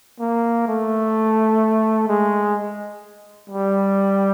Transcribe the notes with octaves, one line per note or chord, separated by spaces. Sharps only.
A#3
A3
G#3
G3